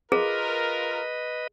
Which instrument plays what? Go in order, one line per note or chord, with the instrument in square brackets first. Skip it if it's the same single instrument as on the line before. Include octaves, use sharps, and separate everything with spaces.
[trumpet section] F4 A#4 [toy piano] G#4 [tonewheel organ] B4 D#5